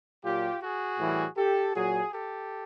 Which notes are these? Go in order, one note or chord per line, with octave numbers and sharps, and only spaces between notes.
A#2 F#3 F4 G4
F#4 G#4
A2 E3 G3
G4 A4
A#2 F#3 F#4 G#4
G4 A4